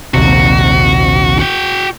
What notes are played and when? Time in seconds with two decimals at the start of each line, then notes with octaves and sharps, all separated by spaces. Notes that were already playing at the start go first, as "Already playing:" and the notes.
0.14 A#1 D#2 C3 F#4
1.39 F#4 G5